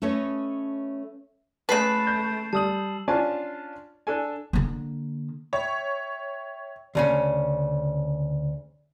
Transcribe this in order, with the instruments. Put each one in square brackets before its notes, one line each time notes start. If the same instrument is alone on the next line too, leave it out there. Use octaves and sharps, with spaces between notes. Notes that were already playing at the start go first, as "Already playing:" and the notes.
[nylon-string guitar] A3 C#4 A4 B4 C#5 D#5
[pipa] C#3 B4 [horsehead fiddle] A3 [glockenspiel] A6 C7 E7
[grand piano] G6
[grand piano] G3 D#6 [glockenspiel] A5 E6 F#7
[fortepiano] C#4 D4 F4 D5 G#5 A5
D4 A4 G#5
[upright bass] D3 A#3
[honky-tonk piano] C#5 [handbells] E5 G5
[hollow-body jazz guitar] D2 C#3 C#4